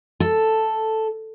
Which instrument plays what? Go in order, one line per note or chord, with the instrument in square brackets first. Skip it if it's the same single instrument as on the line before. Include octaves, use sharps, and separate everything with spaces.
[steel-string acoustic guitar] A4